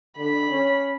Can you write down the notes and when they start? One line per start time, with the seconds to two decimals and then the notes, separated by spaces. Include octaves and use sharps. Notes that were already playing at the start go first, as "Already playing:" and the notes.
0.18 D3 B5
0.50 C#4